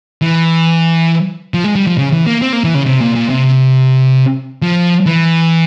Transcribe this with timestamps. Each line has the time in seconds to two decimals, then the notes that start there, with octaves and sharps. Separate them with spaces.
0.22 E3
1.54 F3
1.64 G#3
1.76 G3
1.87 F3
1.98 C#3
2.13 E3
2.27 A#3
2.42 C4
2.53 A#3
2.64 E3
2.75 C#3
2.86 C3
3.01 A#2
3.16 A#2
3.30 C3
4.62 F3
5.06 E3